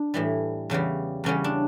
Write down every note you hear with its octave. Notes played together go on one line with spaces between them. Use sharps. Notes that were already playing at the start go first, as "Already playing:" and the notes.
Already playing: D4
A2 E3 G3
E2 C#3 E3 G3
E2 C#3 E3 G3 C#4
D4